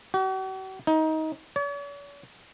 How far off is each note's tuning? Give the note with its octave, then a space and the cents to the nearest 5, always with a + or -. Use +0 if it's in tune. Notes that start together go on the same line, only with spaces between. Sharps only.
F#4 +45
D#4 +20
C#5 +45